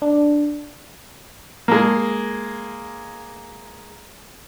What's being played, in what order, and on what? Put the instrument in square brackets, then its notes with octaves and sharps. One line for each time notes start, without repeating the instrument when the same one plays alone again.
[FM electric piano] D4
[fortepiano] G#3 A#3